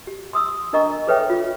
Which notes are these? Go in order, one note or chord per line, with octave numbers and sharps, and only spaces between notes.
G4
C6 D#6 E6
D4 A#4 D#5 A#5 C#6
G#4 A4 B4 C#5 E5 G5
F4